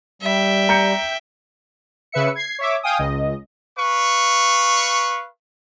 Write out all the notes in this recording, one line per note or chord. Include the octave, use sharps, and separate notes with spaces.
G3 E5 G5
A#5 G6 C#7
C#3 B4 E5 C#7
G#6 C7
C#5 E5 D6
F5 G5 G#5 D#6
C#2 D#5
B4 F5 C#6